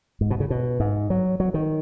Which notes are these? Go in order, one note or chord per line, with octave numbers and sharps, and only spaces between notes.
G#2
B2
C#3
B2
G#2
F#3
F#3
D#3